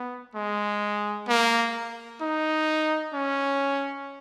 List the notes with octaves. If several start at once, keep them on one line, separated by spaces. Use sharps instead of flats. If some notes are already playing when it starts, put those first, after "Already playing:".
Already playing: B3
G#3
A#3
D#4
C#4